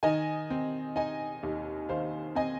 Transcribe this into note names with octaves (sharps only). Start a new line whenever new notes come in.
D#3 D#5 G#5
C4
D#4 D#5 G#5
D#2
D#3 C5 F5
C4 D#5 G#5